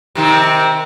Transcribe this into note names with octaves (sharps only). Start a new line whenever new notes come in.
C3 D#3 C4